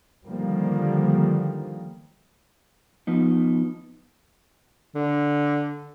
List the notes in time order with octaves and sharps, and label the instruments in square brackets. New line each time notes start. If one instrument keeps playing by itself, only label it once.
[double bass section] D3 D#3 F3 G3 A#3
[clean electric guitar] F3 B3 D#4
[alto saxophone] D3